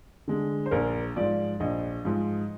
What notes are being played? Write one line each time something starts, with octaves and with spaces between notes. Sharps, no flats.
D3 G#3
C5
A#1 A#4
G#2 F3 D5
A#1 D#5
G#2 F3